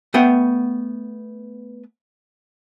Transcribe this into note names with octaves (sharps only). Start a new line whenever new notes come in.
A3 B3 F#5 G5